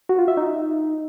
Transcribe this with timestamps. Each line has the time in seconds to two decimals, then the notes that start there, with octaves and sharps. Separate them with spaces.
0.09 F#4
0.19 F4
0.28 E5
0.37 D#4